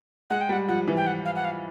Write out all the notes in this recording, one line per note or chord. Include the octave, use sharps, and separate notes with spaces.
G#3 F#5
G5
G3 F#5
F3 F#5
E3
G5
F#5
F5
F#5
F5